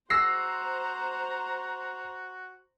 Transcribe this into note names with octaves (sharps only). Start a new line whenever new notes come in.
F#4 C5 A#5 E6 A#6 C7